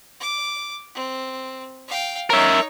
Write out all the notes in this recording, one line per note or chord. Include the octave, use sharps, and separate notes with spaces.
D6
C4
F5 G5
D#4 A#4 C#5 E5